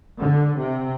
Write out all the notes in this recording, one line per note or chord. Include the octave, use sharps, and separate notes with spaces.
D3
C3